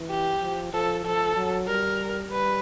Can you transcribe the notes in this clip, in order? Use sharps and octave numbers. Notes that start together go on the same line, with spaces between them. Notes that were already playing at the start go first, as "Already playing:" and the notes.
Already playing: E3
G4
F3
F3 A4
F3 A4
F#3
G3 A#4
G3 B4